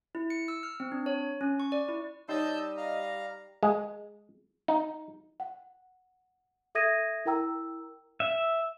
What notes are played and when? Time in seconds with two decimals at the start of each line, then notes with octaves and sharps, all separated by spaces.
0.15 E4
0.30 C#7
0.48 E6
0.63 F6
0.80 C4
0.92 D4
1.06 C#5
1.41 C#4
1.60 C#6
1.72 D5
1.89 E4
2.29 G3 D#4 C#5 D#5 A5 E6 G6
2.77 F5 A#5
3.63 G#3
4.68 D#4
5.40 F#5
6.75 A4 E5 D#6 G#6 A#6 D#7
7.25 E4 A#4 G5 A#5 E6
8.20 E5